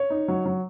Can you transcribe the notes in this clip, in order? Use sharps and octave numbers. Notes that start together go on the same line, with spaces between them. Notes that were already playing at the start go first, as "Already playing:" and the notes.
Already playing: C#5
D#4
F#3
F#3